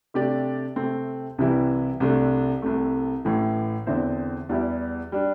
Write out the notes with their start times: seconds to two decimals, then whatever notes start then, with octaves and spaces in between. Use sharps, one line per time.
0.14 C3 A3 D4 G4 D5
0.76 C3 A3 C4
1.38 C2 C3 E3 G3 E4
2.00 C2 C3 A3 D4
2.62 C2 C3 A3
3.25 A1 A2 E3
3.87 E2 D3 C4 E4 C5
4.49 E2 E3 G3 E4 G4
5.12 G3 D4